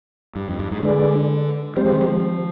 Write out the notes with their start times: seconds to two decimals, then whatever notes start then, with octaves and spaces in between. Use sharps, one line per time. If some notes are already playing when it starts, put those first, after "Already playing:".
0.35 G2
0.48 F2
0.59 G2
0.71 G#2
0.82 D3 G#3 D4 G#4 B4 D5
1.76 G3 G#3 C4 G4 C5
1.85 F3
1.92 D#3
2.01 F3